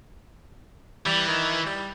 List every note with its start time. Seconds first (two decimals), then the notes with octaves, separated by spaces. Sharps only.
1.06 E3 G3
1.28 D#3
1.66 G3